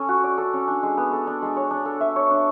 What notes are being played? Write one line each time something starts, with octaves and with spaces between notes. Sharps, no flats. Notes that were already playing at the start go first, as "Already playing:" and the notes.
Already playing: C#4 A4
F#4
D5
A4
C#4
D4
G#3
B3
A4
D4
G#3
C#5
D4
A4
E5
C#5
D4